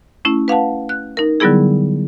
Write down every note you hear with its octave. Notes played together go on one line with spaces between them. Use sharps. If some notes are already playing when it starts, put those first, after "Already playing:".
A3 C#4 E4
B4 F5 F#5 A5
F#6
D#4 A#4
D3 F#3 G3 B3 E4 G#4